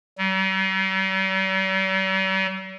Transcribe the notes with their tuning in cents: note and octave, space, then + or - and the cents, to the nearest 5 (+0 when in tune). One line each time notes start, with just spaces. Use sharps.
G3 -45